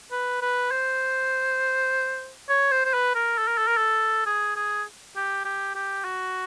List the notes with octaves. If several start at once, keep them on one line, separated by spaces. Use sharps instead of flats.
B4
B4
C5
C#5
C5
C5
B4
A#4
A4
A#4
A4
A#4
A4
G#4
G#4
G4
G4
G4
F#4